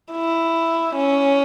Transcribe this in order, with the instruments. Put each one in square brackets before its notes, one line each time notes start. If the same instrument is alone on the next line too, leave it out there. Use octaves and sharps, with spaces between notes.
[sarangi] E4
C#4